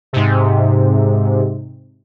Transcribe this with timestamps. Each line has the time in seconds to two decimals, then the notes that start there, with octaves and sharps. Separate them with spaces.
0.13 G#2 C3